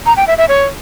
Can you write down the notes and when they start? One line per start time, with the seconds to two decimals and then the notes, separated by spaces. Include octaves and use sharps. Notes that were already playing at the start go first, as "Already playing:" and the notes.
0.06 A#5
0.17 G5
0.27 E5
0.38 E5
0.49 C#5